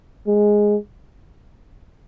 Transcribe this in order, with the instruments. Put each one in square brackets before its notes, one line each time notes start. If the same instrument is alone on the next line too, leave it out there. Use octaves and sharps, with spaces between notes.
[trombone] G#3